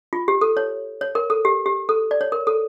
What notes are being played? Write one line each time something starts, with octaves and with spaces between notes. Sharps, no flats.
F4
G4
A4
C#5
C#5
A#4
A4
G4
G4
A4
D5
C#5
A#4
A4